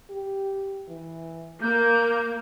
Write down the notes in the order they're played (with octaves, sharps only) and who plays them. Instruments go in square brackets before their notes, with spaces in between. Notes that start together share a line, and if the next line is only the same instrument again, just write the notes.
[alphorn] G4
E3
[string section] A#3 [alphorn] A#4 [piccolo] G6